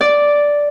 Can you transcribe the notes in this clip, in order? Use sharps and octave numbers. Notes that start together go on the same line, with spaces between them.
D5